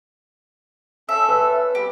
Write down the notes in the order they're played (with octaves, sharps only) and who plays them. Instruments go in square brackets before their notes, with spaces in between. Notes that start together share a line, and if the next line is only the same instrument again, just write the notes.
[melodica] C#4 A4 [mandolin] E5
[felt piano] B4
[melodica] G3 B3 C4 [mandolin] G4